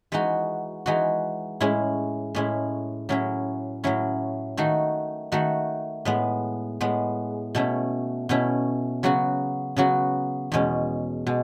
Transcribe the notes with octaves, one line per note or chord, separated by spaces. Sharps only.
E3 G#3 D#4 F#4
E3 G#3 D#4 F#4
A2 G#3 C#4 E4
A2 G#3 C#4 E4
A2 F#3 C#4 E4
A2 F#3 C#4 E4
D#3 A3 D#4 F#4
D#3 A3 D#4 F#4
A2 G#3 B3
A2 G#3 B3
B2 A3 C#4 E4
B2 A3 C#4 E4
C#3 F#3 B3 F#4
C#3 F#3 B3 F#4
E2 B2 G#3 C#4
B2 G#3